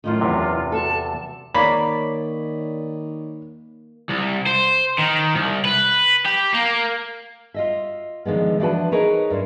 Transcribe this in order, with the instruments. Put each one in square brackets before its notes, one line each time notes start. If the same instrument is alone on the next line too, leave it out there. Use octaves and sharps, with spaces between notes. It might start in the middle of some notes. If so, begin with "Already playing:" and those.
[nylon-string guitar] F#2 A2 D#3 [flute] F4
[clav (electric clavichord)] E2 C3
[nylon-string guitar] F#4 A4 [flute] A5
[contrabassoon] D#3 [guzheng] A#3 [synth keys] C#5 D5 [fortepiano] B5
[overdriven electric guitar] C2
C5
D#3
C2
B4
G4
A#3
[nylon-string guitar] F4 D#5 E5
D3 D#3 F3 G#3 B3
E3 F3 D4 F#4 B4 A5
D#4 G#4 A#4 B4 C#5
G2 E4 C5